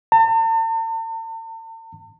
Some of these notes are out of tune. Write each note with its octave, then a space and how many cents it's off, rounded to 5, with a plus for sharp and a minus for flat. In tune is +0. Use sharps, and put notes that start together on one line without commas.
A5 +45